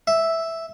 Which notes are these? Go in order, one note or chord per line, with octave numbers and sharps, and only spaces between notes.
E5